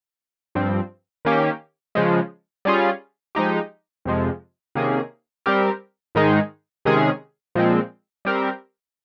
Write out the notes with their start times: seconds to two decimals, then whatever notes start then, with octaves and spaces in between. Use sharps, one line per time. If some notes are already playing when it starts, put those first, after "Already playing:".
0.55 G2 F3 C4
1.25 D#3 A#3 C#4 G4
1.95 C#3 F3 G#3
2.65 G3 C#4 F4 G#4
3.35 F3 G#3 D#4 G4
4.05 F2 C3 F3 G#3
4.75 C3 D#3 A#3 C#4 G#4
5.46 G3 C4 G4 A#4
6.15 G#2 D#3 G#3 D#4 G#4
6.85 C3 D#3 G#3 C#4 G#4
7.55 A#2 F3 G#3 C4
8.25 G3 C4 G4 A#4